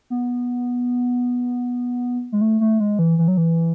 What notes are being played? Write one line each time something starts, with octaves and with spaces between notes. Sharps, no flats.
B3
G#3
A3
A3
G#3
E3
E3
F#3
E3